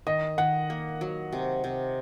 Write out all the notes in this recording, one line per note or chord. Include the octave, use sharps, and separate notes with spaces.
D#3 D#5
D#3 F#5
A#3
F#3
C3
C3